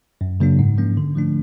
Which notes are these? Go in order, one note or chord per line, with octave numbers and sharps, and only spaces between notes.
F#2
C#3 F#3 A#3 D4
G#2
F3 A#3 C#4
D3
F3 A3 D4